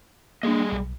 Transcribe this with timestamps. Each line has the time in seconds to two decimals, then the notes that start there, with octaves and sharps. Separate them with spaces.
0.43 G3 A#3 D4 G#4 D#5
0.72 B1